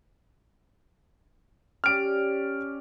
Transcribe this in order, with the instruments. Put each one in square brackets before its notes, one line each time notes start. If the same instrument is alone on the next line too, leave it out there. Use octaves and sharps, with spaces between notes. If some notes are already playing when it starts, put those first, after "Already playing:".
[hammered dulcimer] C#4 G4 D5 [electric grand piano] F6 D7